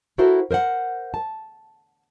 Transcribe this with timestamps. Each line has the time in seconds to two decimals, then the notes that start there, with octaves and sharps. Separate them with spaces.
0.18 E4 F#4 A4 A#4 C5 E5
0.51 A#4 C5 D#5 F#5
1.14 A5